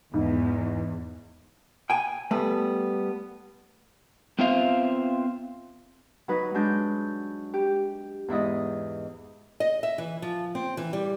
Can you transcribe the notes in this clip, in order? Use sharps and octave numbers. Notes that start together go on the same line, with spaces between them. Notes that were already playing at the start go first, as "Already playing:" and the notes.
E2 G#2
G5 G#5
G3 A3 B3
B3 C4 F4 C5 E5 F5
F#3 D#4 B4
F#3 G#3 D4 G6
G4
E2 G#2 E4 D#5
D#5
E5
E3
F3
C4
E3
G3